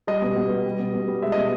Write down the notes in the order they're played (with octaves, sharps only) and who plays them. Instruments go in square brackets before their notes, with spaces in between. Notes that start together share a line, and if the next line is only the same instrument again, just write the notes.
[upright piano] G3 D#5
B2
B2
G3
G3
B2
B2
G3
G#3 E5
D#5
B2